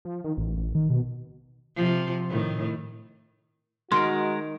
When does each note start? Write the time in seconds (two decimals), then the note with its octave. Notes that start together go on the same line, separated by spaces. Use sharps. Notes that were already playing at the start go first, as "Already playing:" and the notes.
0.05 F3
0.24 D#3
0.37 A1
0.57 A1
0.75 D#3
0.90 B2
1.76 C3 F3
2.29 A2 D#3
3.92 D#3 G#3 F#4 A#4 C6